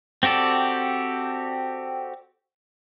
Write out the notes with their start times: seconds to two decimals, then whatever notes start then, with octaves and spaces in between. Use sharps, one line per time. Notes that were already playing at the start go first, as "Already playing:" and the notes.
0.23 C4 F#4 G4 A4 D5